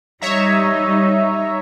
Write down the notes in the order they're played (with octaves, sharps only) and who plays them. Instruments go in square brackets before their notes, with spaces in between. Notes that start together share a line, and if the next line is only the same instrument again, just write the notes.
[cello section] G3 D#4 [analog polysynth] C#5 E5 A#5